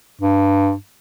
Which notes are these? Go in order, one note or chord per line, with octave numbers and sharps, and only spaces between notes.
G2